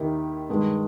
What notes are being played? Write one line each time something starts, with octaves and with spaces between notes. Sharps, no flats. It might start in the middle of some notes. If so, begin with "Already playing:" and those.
Already playing: D#2 D#3 A#3 E4 G4
G2 D#3 G#3